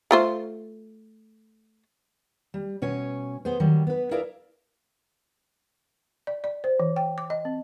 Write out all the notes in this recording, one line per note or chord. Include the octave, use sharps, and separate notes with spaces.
A3 F4 C5
G3
B2 C#4 C#5 G#5
B3 G#4 C5
D#3 F#3 G3
B3 B4
E4 G#4 A#4 D5 E5 F5
D5
D5
C5
E3
G5
D6
D#5
C4